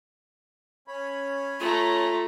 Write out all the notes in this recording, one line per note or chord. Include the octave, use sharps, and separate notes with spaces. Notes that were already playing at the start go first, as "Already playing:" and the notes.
C#4 C#5 B5
A3 F4 A#5